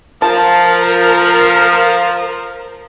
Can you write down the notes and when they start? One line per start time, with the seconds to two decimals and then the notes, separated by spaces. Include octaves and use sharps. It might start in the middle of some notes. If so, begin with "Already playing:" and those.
0.22 F3 A#4 A5